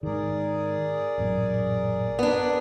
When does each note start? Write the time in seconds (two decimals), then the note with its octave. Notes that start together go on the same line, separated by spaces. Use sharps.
0.03 G#2 D#3 G#4 A#4 D5
1.18 A1 F#2 A#2
2.19 B3 D4